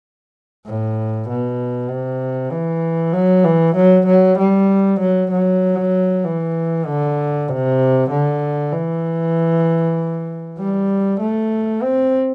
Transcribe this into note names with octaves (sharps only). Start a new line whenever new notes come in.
A2
B2
C3
E3
F#3
E3
F#3
F#3
G3
F#3
F#3
E3
D3
C3
D3
E3
G3
A3
C4